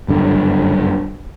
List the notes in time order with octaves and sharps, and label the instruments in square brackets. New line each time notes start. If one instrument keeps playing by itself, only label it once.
[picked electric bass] F#1 G2 D3